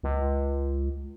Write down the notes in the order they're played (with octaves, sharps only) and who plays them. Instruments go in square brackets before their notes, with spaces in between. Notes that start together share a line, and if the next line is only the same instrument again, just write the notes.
[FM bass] C#2